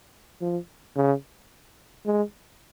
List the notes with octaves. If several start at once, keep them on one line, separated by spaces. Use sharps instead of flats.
F3
C#3
G#3